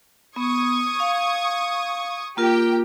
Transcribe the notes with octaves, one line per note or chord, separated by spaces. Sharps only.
B3 C#6 D#6 G#6
F5
A#3 F4 G4 A#4 G5